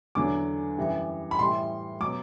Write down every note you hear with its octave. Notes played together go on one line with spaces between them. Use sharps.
E2 D3 F#3 D6
F#2 E3 G3
B5
A2 E3 G3 C6
B2 F#3 D6